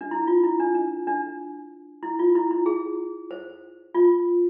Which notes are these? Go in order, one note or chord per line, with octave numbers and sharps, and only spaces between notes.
D4
E4
F4
E4
D4
D4
D4
E4
F4
E4
E4
G#4
C5
F4